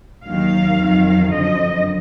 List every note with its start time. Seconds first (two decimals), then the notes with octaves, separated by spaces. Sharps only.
0.24 D#2 D#3 F#3 F5
0.77 F2 D#3 F#3
1.29 F#2 D3 F3 D#5